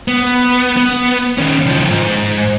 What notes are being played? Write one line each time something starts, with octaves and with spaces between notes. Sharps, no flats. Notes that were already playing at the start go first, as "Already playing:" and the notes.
B3
B3
D#3 C#4
D#3 F3
G#2